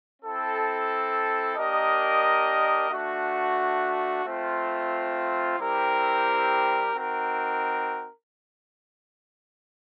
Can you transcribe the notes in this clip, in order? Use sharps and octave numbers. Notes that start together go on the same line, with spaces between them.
C4 E4 A4
A#3 D4 G4 A#4 D#5
A3 D4 F#4
A3 C4 F4
G3 C4 E4 G4 A#4
C4 D#4 F#4 A#4